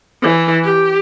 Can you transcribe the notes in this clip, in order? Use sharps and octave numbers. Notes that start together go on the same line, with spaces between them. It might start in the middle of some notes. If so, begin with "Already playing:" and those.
E3
G4